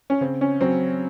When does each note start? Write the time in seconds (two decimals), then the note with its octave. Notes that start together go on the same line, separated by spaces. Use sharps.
0.10 C#4
0.21 C#3 C4
0.41 C#4
0.61 F#3 C4